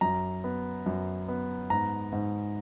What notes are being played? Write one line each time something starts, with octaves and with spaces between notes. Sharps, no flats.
F#2 A#5
B3
F#2
B3
G#2 A#5
G#2